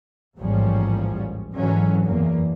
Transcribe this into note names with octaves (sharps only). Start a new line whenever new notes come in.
A1 D#2 G#2 F3 G3 C#4
G#2 D3 E3 F#3 C#4
F#1 E2 A#3